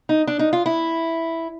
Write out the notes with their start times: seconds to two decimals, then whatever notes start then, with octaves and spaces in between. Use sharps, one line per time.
0.09 D#4
0.27 D4
0.39 D#4
0.53 F4
0.66 E4